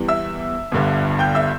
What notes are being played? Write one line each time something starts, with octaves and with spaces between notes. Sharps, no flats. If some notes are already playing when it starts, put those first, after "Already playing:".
Already playing: E2 E3 G3
E5 E6
G1 G2 D3
G5 G6
E5 E6